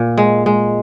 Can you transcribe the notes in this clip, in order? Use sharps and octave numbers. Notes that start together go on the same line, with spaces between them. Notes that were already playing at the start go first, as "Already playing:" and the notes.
Already playing: A#2
G#3
G#3